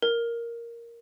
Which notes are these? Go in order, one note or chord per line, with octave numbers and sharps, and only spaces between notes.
A#4